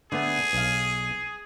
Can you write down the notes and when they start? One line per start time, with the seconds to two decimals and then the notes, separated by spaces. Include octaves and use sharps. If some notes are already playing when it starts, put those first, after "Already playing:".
0.12 D3 A3 B3 G#4
0.53 B1 F5